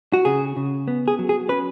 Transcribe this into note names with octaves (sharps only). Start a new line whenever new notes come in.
F#4
C#3 G#4
C#3
B3
G#4
F#3
G#4
C#4 B4